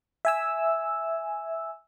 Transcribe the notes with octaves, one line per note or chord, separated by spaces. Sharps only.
E5 G#5 E6